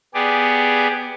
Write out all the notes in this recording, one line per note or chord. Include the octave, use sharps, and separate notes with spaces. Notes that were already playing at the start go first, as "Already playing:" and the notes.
B3 G4 G#4 D5